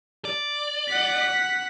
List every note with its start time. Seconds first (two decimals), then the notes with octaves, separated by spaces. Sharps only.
0.25 D5
0.89 F#5 B6